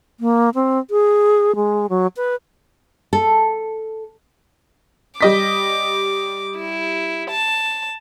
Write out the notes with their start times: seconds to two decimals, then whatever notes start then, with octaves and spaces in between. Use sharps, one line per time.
0.20 A#3
0.55 C4
0.90 G#4
1.56 G#3
1.89 F#3
2.17 B4
3.13 A4
5.21 G3 D#5 D6 B6
6.57 E4
7.30 A5